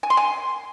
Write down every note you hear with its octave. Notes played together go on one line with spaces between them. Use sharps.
G#5
C6
G#5